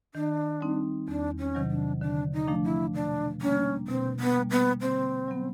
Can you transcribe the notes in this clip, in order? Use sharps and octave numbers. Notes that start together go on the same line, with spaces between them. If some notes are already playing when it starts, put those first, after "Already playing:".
D#3 D4
G3 C4 D#4
E2 D4
C#4
C3 D#3 F#3
D4
D3 D4
D#4
F3 A3 D4
E4
B2 D4
G3 A#3 C#4 D4
B2 C4
B3
G3 A#3
B3
D3 C4
F#3 B3